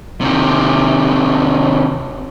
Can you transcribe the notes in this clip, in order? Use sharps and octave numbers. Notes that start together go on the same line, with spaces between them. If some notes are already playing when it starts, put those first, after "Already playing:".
C3 D#3